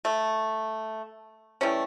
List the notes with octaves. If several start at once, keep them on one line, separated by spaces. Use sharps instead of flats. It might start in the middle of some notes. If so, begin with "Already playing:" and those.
A3
E3 G3 A3 C#4